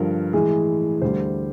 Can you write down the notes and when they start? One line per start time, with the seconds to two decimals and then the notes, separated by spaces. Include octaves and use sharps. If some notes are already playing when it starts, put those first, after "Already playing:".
Already playing: G2 D3 F3 A#4
0.33 A2 E3 G#3 G#4
1.02 D2 D3 G3 C5